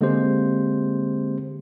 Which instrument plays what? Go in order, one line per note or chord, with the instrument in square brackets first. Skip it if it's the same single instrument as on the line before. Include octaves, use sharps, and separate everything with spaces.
[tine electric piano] D3 G#3 A#3 C4 G4 C5